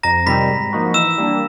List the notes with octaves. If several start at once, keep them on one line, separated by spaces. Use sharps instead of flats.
F2 A#5 A#6
C3 D#3 G3 C4 B5 B6
G#2
F3 A#3 D#4 F#4
E3 E6 E7
G3 A#3 D4